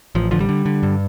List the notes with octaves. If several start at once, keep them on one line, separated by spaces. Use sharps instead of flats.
A1 F3
D3 F3
G3
D3
D3
G2